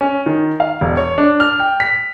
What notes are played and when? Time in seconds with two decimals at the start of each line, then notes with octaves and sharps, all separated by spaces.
0.01 C#4
0.26 D#3
0.60 F5
0.81 E1
0.97 C#5
1.18 D4
1.40 F6
1.59 G5
1.80 B6